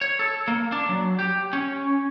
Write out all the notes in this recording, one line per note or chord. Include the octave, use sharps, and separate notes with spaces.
C#5
A4
A#3
D4
F#3
G4
C#4